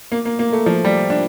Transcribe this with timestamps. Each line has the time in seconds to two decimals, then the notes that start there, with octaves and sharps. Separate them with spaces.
0.12 A#3
0.25 A#3
0.39 A#3
0.53 A3
0.66 F3
0.85 G3
1.10 D4